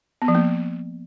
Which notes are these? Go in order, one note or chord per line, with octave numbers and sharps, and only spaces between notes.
B3
F3
A#3